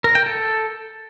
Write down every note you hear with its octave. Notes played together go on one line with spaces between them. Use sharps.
A#4
G5
A4